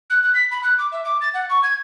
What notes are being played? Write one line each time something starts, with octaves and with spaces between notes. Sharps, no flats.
F#6
F#6
B6
B5
F#6
D6
E5
D6
A6
F#5
C#6
G#6